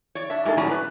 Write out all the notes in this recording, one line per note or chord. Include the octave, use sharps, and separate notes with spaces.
C#5 D5
D4 E5
G#2 G#3 A#3 A4
A2 F#3 C#4 D5 A#5
B4